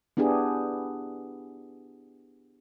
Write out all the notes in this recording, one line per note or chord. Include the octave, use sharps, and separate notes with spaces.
B3 D4 E4 G4 G#4